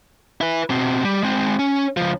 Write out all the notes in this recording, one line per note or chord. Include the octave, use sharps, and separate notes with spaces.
E4 B4
B2 C4
G3
G#3 C4
C#4
C#2 F3